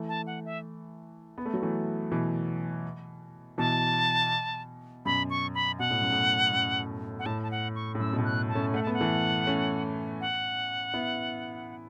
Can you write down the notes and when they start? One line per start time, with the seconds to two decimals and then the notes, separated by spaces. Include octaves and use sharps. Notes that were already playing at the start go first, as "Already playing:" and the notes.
Already playing: E3 A3
0.09 A5
0.27 F#5
0.45 E5
1.38 B3
1.46 A3
1.54 F#3
1.62 E3 A3
2.12 B2 E3
3.58 B2 E3 A5
5.05 F#2 B2 B5
5.30 C#6
5.54 B5
5.79 B2 F#5
5.91 A2
6.01 F#2
6.12 A2
6.52 F#2
7.19 F#5
7.26 A2 A5
7.42 A5
7.51 F#5
7.75 C#6
7.95 A2
7.99 F#2 E6
8.13 B2
8.18 A2
8.24 F#6
8.49 A5
8.55 A3 C#4
8.73 A3 F#5
8.83 B3 A5
8.93 F#5
9.01 E3 A3
9.47 A3 C#4
10.20 F#5
10.94 B3 E4